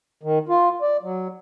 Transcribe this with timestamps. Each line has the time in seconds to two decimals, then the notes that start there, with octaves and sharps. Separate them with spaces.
0.23 D#3
0.49 F4
0.82 D5
1.03 F#3